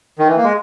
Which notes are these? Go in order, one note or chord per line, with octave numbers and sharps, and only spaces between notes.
D#3
E3
A#3
G#3